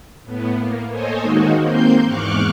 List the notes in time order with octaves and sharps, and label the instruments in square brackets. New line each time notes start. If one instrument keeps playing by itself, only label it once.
[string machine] A2 B3
A#3
A4 C5 C#5 D#5 G#5
D#3 G#3 A#3 D#4 F#4
A#3 C4 C6 G6
E2 G#2 C#6 D6 F6 F#6